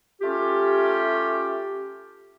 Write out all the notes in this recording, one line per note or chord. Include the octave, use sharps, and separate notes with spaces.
A3 C#4 F4 G4